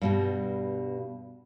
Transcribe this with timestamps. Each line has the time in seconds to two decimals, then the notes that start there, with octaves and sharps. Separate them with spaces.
0.01 G2 B2 G3